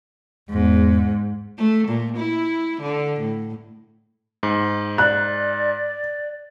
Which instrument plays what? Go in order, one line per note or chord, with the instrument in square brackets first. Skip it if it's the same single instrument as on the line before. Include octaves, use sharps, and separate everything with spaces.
[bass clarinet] E2 [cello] G#2
[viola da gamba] A3
A#2
E4
D3
A2
[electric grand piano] G#2
[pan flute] D5 [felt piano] F#6